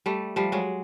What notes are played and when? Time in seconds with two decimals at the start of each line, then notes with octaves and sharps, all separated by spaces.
0.06 G3 A3
0.36 F3 G3
0.52 F#3 G#3